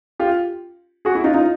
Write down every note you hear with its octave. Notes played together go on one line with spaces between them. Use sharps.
F4 G4
F#4 G#4
E4 F#4
D#4 F4
D#4 F4